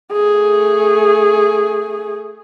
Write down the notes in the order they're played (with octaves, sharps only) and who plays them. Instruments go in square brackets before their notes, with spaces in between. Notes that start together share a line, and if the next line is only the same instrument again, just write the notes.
[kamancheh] A3 G#4